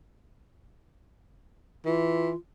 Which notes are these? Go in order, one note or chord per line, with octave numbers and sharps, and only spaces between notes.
E3 F4